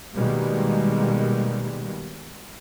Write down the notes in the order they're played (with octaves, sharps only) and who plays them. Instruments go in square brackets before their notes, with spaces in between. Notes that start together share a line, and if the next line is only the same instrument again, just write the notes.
[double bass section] B2 D#3 G3 G#3 A#3